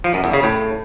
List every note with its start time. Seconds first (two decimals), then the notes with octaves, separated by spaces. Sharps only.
0.04 F3
0.14 F#2
0.24 E2
0.33 C#3
0.43 A2